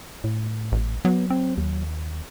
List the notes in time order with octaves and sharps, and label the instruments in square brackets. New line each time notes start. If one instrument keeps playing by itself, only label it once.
[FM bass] A2
[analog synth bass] A1
[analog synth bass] F#3 [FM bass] B3
[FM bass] C4
D#2